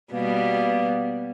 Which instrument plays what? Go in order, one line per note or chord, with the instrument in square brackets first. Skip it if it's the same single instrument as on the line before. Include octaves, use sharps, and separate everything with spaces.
[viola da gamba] B2 G3 B3 [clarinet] A#3